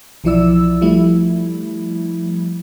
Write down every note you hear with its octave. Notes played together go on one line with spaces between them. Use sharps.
B1 E3 F3 E4 D5 E6
F3 G3 A3 E4